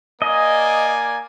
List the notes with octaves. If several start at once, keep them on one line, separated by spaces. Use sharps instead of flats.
A#3 D5 D#5 G#5